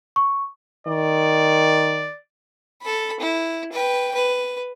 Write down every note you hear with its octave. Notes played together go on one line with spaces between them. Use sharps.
C#6
D#3 D5
A4 B5
E4
B4 G5
B4